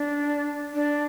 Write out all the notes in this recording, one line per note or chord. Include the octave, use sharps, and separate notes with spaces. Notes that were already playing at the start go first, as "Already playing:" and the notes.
Already playing: D4
D4